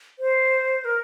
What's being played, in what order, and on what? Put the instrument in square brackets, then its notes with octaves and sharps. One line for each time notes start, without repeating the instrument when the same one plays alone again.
[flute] C5
A#4